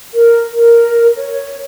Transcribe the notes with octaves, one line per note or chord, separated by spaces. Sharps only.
A#4
A#4
C#5